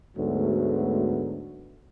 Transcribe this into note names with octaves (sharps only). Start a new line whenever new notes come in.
D2 G#2 F#3 A3 B3